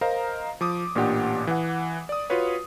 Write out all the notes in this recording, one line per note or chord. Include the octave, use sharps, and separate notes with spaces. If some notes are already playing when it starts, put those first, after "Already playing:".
A#4 C5 D#5 F5 A#5
F3 D6 D#6
A1 A#2 D4 G4 F#5
E3 F#5
D5 D#6
F4 F#4 B4 C#5